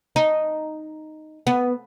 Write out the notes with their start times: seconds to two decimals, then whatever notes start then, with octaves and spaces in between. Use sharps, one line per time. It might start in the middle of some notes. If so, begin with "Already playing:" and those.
0.16 D#4
1.47 B3